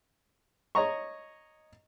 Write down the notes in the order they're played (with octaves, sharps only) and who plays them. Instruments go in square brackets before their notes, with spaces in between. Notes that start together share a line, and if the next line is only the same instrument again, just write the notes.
[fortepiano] C#5 D#5 A#5 C#6